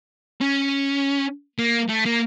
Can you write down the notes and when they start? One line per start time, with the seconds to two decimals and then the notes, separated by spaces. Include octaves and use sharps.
0.41 C#4
1.59 A#3
1.89 A3
2.05 A#3